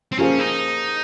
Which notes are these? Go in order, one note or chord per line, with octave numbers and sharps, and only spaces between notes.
C4
F3 A#3 C#4 F4 G#4 C5
D#4